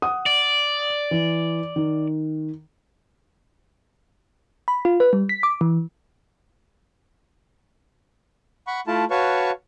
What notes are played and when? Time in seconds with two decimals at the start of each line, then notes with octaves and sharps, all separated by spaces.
0.02 F#5 D#6
0.26 D5
1.11 E3
1.76 D#3
4.68 B5
4.85 F4
5.00 B4
5.13 G3
5.29 B6
5.43 D6
5.61 E3
8.67 F#5 B5 C#6
8.87 A3 E4 F4 A5
9.11 F#4 B4 C#5 F5 A5 C#6